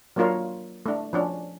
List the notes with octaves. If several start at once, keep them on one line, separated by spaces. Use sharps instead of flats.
F#3 A#3 D4 F4 A#4 C#5
A3 D4
F3 C#4 D4